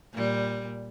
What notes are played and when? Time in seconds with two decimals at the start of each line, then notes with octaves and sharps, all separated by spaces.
0.13 A#2 G3